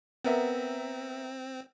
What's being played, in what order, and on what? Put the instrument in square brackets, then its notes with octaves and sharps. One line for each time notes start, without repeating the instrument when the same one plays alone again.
[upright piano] B3 A#4 E5 [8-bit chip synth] C4